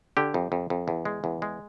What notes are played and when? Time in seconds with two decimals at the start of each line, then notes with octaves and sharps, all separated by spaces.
0.17 D3 G4
0.34 F2
0.52 F2
0.70 F2
0.88 E2
1.05 G#3
1.24 E2
1.42 G#3